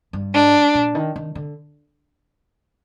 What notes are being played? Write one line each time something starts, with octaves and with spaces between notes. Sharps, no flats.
G2
G#2 D4
A#2
D#3
D#3
D3